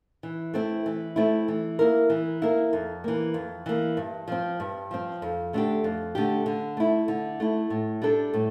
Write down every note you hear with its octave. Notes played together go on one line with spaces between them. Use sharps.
E3
A3 C4 E4
E3
A3 C4 E4
E3
A#3 E4 A#4
E3
A#3 E4 A#4
F2
E3 A#3
F2
E3 A#3
G2
F3 C4
G2
F3 C4
F2
D3 A3 D4 G4
F2
D3 A3 D4 G4
D3
A3 E4
D3
A3 E4
A2
G3 D4 A4
A2